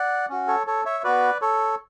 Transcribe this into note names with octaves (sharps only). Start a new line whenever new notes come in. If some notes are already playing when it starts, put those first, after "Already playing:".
Already playing: D5 F#5
C#4 F#4
A4 C#5
A4 C#5
C#5 E5
B3 F#4 B4 D5
A4 C#5